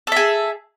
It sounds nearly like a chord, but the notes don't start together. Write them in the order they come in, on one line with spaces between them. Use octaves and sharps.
A4 E5 G#4